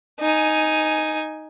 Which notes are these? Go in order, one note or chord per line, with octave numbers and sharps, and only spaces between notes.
D#4 G#5